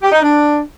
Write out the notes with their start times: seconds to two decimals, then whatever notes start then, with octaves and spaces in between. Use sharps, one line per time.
0.02 G4
0.12 D#4
0.22 D4